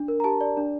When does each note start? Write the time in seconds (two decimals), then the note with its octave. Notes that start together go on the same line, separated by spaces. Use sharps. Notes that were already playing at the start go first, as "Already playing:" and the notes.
Already playing: D4
0.08 A#4
0.20 A#5
0.24 G4 A5
0.41 D5
0.57 D4